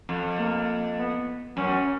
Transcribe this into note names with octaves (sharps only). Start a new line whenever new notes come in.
F2
A#3
B3
F#2 C#4